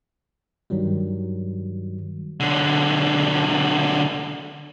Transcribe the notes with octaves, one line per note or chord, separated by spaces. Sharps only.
G2 D#3 F#3 G3
B1 D3